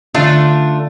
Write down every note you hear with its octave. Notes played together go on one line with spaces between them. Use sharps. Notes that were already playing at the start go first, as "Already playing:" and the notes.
D3 A3 C#4 D4 F4